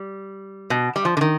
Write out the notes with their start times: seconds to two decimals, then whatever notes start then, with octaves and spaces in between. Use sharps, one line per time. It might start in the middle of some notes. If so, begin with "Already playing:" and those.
Already playing: G3
0.70 B2
0.96 G3
1.05 F3
1.17 D3
1.21 D#3